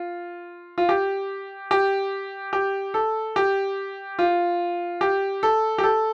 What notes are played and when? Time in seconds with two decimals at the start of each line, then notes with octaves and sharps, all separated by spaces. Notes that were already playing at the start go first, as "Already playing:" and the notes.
Already playing: F4
0.78 F4
0.89 G4
1.71 G4
2.53 G4
2.94 A4
3.36 G4
4.19 F4
5.01 G4
5.43 A4
5.78 G4
5.83 A4